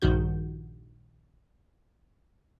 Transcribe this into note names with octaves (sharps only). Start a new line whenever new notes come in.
A#1 G2 D#3 F#4 G6